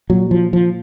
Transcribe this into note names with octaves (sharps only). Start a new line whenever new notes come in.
A#2 F#3
F3
F3